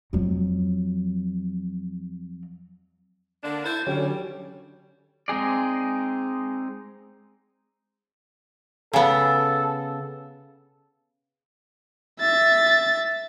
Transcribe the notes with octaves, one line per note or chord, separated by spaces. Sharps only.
F2 F#3
D3 A#3 D4 A5
E4 A4 C5 G#6 A6
D3 F#3 G3 C#4
G#3 C4 D#4 G#4 D5
C#3 B3 A4
E5 A6